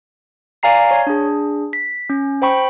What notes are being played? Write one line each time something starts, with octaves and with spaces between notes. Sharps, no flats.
D5 F5 G#5 A#5 C7
C#5
D4 G#4
B6
C#4
C5 G5 B5 C#6